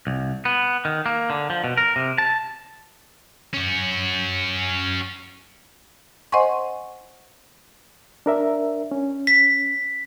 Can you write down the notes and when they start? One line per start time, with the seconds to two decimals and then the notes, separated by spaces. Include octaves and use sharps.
0.07 C2
0.45 B3
0.85 D#3
1.06 A#3
1.30 D3
1.50 F3
1.64 B2
1.77 A#4
1.96 C3
2.18 A5
3.54 C#4 F#4
6.32 C5 D#5 F#5 G#5 C6 C#6
8.26 D4 A#4 E5
8.91 C#4
9.27 B6